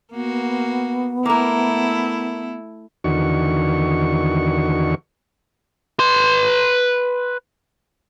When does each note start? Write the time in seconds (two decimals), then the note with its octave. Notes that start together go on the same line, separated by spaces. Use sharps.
0.12 A#3 B3 F#4
1.25 A3 A#3 E4 A#4
3.04 E2 D3 D#3 F#4 C#6
5.99 B4 C6